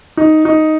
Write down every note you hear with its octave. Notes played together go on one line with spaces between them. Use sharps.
D#4
D#4